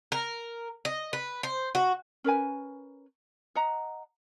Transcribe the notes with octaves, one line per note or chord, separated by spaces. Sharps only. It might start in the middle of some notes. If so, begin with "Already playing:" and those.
A#4
D#5
B4
C5
F#4
C#4 A#4 B4 G#5
D#5 F#5 A#5